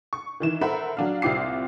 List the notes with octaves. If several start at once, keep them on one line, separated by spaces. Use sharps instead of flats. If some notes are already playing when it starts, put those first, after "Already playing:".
C#6
D#3 E3 E7
A4 A#4 C5 E5 F#5 B5
F#3 D4 F5
C2 C4 F4 G4 D6 C7